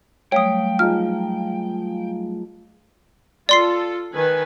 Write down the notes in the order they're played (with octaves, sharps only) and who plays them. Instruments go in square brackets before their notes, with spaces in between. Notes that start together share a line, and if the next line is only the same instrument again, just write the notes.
[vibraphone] F#3 G3 A3 [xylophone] C#5 D#6 [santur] F5 [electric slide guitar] G5
[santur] F3 D#4 G#4 [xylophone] F6
[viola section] F4 A4 [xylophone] D5 C6 C7
[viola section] D#3 B4 G#5